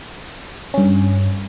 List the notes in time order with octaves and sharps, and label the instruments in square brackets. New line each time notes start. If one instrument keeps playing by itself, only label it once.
[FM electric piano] G2 C#4